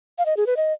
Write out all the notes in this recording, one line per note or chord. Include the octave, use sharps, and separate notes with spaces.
F5
D#5
G#4
B4
D#5